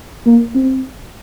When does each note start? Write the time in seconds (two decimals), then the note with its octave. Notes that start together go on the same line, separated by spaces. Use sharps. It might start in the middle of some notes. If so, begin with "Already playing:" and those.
0.26 A#3
0.55 C4